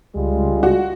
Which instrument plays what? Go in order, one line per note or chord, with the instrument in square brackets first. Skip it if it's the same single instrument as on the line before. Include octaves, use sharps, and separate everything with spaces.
[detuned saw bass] C#2 [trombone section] G3 G#3 F4
[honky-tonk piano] F#4